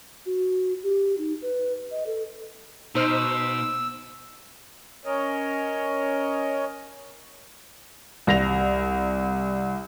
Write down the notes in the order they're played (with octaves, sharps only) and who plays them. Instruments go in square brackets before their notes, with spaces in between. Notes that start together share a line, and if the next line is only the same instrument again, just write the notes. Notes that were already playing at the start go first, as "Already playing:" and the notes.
[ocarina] F#4
G4
D#4
B4
D#5
A4
[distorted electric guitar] B2 [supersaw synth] D#4 C5 F6 [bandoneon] E6
[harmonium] C#4 A#4 C#5 D#5
[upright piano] C2 A#6 F7